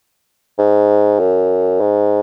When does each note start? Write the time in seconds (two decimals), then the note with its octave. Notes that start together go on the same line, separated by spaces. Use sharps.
0.58 G#2
1.20 F#2
1.80 G#2